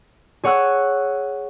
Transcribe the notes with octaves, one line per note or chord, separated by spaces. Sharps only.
G#4 C#5 F#5 C#6 E6 F#6